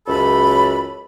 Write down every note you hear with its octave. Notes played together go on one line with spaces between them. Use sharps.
C#2 F#2 A4 B5